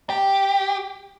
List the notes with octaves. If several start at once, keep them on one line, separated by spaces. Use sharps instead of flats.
G4